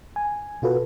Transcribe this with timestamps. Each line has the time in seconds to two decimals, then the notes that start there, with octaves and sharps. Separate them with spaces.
0.16 G#5
0.62 B2 F4 F#4 A4 B4